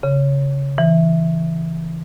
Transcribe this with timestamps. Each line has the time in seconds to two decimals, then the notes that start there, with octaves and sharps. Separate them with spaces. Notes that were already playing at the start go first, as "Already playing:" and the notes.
0.03 C#3
0.78 E3